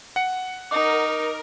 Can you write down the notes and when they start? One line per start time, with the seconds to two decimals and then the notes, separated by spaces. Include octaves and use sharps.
0.16 F#5 C#7
0.71 D#4 A#4 D#5 D6